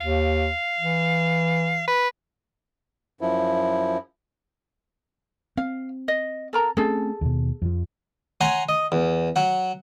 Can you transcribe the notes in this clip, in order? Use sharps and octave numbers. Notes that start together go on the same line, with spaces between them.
D#2 F5
E3
B4
F#2 F3 E4
C4 F5
D#5
A4 A#4 A#5
A3 C4 C#4 G#4 A4
D#2 B2
F2 F3
C#5 F#5 G#5 A#5 C6
D#5
E2
F#3 F#5